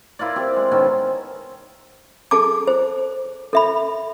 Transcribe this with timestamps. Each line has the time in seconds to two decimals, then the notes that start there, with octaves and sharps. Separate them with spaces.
0.19 E4 F4 A#4 D5
0.36 C4 G4
0.56 G#3
0.71 B2 D#3 C4 C#4
2.31 G#4 A4 A5 D6
2.67 C5
3.53 A4 E5 B5